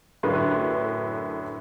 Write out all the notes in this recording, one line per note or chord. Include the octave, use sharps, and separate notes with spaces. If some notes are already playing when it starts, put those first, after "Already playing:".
F#2 A2 D3 B4 C6